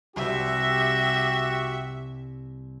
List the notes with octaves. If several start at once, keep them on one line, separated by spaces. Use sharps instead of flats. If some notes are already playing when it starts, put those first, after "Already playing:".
C2 F#4 G4 C5 E5